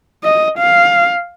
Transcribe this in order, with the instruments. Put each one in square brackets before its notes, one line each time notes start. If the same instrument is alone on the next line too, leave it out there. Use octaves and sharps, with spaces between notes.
[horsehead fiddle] D#5
F5